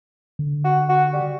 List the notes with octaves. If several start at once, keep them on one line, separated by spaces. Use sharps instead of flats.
D3
F#4
F#4
G3